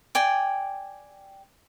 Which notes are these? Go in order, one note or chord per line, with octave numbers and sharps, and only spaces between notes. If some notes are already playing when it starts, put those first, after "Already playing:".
D5 G5 G#5